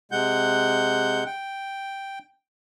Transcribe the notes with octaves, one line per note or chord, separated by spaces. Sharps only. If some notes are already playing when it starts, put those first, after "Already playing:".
C3 G#3 F#5 G6
G5